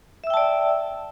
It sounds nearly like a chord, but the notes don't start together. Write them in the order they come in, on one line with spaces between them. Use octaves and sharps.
E5 E6 G5 A5 D5